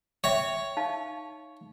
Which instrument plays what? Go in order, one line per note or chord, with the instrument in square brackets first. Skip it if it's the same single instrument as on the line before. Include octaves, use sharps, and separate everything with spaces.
[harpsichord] C#5 [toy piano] E5 G5
[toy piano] D#4 F5 A5